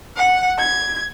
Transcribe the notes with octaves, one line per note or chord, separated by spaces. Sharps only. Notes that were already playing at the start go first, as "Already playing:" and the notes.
F#5
G#6